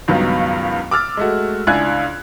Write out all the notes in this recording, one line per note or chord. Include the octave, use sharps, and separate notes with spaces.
C#2 G2 D#3 F#3 B3
D6 E6 F6 A6
G#3 A3 F#4
C#2 D4 E4 G#5 F#6 G#6